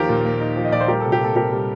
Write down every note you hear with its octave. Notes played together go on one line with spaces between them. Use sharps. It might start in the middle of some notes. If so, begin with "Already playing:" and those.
Already playing: D#2 F3 G4 A#4
A#2
A#3
D#4
F3
D#5
A#2 D5
C5
G3 G4 A#4
C3 A4
G4
A#3 A4
C3 G4 A#4
G3